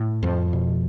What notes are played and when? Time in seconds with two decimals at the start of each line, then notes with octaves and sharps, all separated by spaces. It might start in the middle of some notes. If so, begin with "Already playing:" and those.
Already playing: A2
0.23 F2 F3
0.53 B2